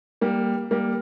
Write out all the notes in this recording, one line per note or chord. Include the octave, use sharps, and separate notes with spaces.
G3 A#3
G3 A#3